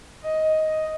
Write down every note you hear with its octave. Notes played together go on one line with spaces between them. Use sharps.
D#5
D#5